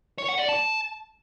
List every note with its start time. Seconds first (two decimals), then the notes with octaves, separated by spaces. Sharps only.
0.18 C#5
0.28 F#5
0.39 D5
0.49 A5